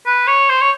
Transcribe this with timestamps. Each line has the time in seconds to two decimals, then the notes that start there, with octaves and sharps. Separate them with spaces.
0.06 B4
0.27 C#5
0.49 C5
0.61 C#5